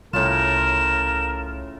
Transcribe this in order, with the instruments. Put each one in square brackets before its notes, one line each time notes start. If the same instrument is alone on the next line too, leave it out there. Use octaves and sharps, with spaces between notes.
[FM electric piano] C2 [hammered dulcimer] A2 C#3 F4 [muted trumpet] A#4 [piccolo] E7